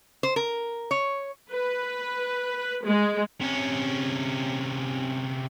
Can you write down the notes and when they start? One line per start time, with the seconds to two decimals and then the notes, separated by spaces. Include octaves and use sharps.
0.23 C5
0.36 A#4
0.91 C#5
1.52 B4
2.84 G#3
3.41 C3 C#4